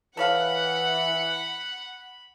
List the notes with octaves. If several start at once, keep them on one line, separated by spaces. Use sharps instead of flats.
E3 A4 C#5 F5 F#5 B5